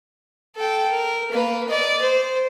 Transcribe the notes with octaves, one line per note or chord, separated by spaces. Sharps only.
A4 G5
A#4
A#3 B4
D5 D#5
C5